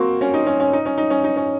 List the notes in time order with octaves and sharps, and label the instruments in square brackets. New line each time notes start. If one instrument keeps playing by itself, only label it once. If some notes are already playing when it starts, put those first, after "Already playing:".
Already playing: [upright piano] A#3 C4 [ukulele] F#4
[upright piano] C#4
D#4
C#4
C#4
D#4
C#4
D#4
C#4
D#4
C#4